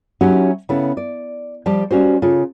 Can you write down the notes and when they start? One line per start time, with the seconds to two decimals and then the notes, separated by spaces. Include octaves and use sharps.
0.21 F#3 C#4 D#4 E4 F#4 G4
0.69 C#3 B3 E4 A4
0.97 D5
1.66 F3 G3 G4 C5 A5
1.91 G3 C#4 F#4 C5
2.22 C#3 F4 A4